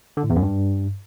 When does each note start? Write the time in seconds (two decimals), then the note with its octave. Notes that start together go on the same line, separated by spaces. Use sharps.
0.17 D3
0.23 A2
0.30 E2
0.36 F#2
0.42 G2